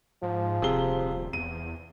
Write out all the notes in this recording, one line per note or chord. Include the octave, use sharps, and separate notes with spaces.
G#2 F3
D#1 C3 G#4 G7
E2 D#7